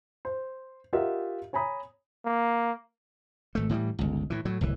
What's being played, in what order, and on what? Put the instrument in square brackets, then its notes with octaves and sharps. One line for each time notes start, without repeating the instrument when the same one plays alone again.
[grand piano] C5
F4 G4 A#4 D#5 E5 F#5
C#5 G#5 A#5 B5 D#6
[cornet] A#3
[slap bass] G#1 A3
A2 E3 F#3 G3
G1 C#2
A2 E3
A2 F#3
D1 C2 E3